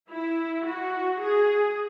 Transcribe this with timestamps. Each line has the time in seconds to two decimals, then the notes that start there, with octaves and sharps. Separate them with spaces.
0.11 E4
0.67 F#4
1.21 G#4